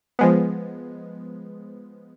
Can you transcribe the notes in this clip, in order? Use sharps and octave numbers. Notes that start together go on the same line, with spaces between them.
F3 G#3 B3